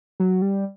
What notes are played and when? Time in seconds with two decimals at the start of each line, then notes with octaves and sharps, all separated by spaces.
0.20 F#3
0.42 G3